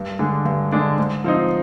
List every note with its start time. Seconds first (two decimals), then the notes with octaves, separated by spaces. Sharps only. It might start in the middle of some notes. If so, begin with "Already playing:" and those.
Already playing: G2
0.19 D3 G#3 D4
0.46 G2
0.72 D3 G#3 D4
0.98 G#2
1.24 F3 C4 D#4